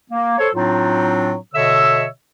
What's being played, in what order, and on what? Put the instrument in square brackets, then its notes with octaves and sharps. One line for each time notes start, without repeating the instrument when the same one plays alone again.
[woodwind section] A#3
A4 C5 C#5
A2 F#3 C4 D4 D#4 F4
B2 D3 C#5 D#5 E5 E6